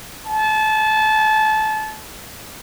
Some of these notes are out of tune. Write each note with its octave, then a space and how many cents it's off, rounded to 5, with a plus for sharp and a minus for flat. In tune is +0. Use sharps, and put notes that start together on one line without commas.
A5 -25